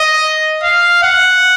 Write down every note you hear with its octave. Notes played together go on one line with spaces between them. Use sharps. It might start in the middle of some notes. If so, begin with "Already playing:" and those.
Already playing: D#5
F5
F#5